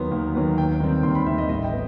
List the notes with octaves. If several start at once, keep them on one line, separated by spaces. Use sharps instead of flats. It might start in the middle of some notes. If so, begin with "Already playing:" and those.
Already playing: D#2 D#3 F#3 B3 C6
D#2
D#3 F#3 B3
D#2 G5
D#3 G3 C4
D#2 C6
B5
D#3 G3 C4 E5
D#5
A1 D#5
G5
B3